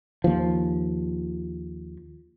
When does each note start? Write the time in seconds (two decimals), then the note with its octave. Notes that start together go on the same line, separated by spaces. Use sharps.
0.24 D#2 F3